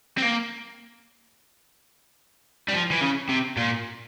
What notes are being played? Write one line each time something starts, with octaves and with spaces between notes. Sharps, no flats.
C4
A#3
G3
F3
E3
C#3
C3
A#2